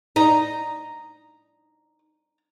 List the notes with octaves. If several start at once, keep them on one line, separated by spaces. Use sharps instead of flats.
D#4 A#5